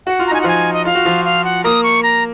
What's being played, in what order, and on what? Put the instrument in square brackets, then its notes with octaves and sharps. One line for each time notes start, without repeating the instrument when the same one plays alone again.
[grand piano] F#4 [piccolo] F#5
[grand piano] F4
[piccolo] A#5
[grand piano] D#4 [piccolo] G#5
[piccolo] F#5
[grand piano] F3 F4 [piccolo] G#5
[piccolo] D#5
[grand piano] F4 [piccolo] F5
[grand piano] F#4
F3 F4
[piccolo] F5
F#5
[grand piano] A#3 A#4 [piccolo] D#6
[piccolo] C#6
A#5